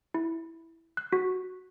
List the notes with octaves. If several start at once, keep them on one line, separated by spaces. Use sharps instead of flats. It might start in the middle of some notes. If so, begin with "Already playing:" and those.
E4
F#6
F#4